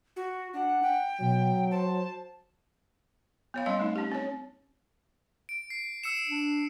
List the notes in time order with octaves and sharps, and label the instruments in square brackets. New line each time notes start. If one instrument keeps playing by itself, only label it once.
[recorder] F#4
[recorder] D4 [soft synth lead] F#5
[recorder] G5
[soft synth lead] B2 [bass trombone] F#3
[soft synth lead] C5 [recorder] A5
[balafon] B3 C#5 F5
G3 C4 C#4 D#5 F5 C6
A3 D#4
C#4 G4
C4 C#4 C#5
[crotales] D7
C7
E6 C#7 E7
[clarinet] D4